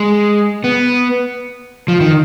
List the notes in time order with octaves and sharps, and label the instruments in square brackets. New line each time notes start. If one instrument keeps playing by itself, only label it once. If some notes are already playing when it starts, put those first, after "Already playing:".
Already playing: [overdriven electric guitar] G#3
B3
F3
D#3